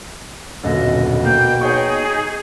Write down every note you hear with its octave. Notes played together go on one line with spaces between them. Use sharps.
D#1 F#2 B2 D3 D#5
A#3 G5 G6
D#4 G#4 C#5 G5 C#6